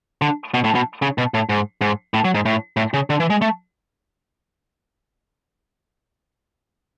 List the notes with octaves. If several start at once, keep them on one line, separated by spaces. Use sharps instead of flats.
D3
B2
A2
B2
C#3
B2
A2
G#2
G#2
A2
F#3
G#2
A2
A2
C#3
D3
E3
G#3
A3